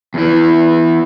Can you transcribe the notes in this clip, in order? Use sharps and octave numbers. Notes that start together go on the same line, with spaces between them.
E2 E3